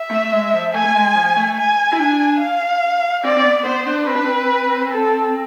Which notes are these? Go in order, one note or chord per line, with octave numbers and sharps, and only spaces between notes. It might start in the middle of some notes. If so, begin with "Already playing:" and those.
Already playing: E5
A3
G#3
F3
A3 G#5
A3
G#3
F3
A3
G#5
E4
D4 G#5
F5
C4 D5
C4
B3
B3 C5
D4
C4 B4
D4
C4
A4